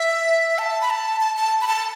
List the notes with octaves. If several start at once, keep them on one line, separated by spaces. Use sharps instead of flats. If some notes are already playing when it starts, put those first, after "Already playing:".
Already playing: E5
A5
B5
A5
A5
A5
B5
A5